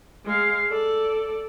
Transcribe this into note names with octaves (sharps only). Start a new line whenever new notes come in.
G#3 F5
A4 D5